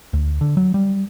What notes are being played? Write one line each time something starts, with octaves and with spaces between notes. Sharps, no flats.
D2
D3
F#3
G3